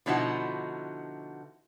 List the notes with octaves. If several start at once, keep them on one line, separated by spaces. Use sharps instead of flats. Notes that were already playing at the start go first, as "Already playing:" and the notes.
B2 D3 F3 D#4 E4 F#4